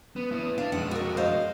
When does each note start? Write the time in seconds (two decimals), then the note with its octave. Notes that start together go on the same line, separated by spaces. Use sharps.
0.16 B3
0.31 B3 E4
0.58 D4 F5
0.72 F2 G#3 F#5
0.91 F#4 A#4
1.17 C5 D#5 F5